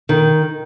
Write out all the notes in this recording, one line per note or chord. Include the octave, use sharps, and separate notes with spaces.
D#3